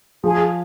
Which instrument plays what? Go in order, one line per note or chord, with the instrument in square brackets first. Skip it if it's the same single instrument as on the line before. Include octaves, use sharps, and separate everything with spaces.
[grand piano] F3 [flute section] G#4